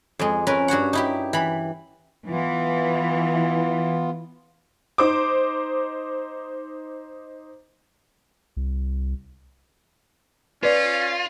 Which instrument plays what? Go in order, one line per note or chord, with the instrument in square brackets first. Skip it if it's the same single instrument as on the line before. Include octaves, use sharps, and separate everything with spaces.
[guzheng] F2 G#3
C#4 A#4 B4
G2 F#4 C#5 F#5
D#4 E4 G4
E3 B5
[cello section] E3 [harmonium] B3 F4
[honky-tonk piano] D#4 C5 D6
[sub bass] C2
[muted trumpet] C#4 [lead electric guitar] F4 [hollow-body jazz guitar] B4 D5